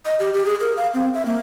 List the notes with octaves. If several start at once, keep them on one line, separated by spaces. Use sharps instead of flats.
D#5
G4
G4
G#4
A#4
F5
C4
E5
A#3